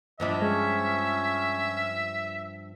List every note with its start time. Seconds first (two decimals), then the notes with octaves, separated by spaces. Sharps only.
0.20 G2 F3 D4 D#5 E5
0.42 G#3 C#4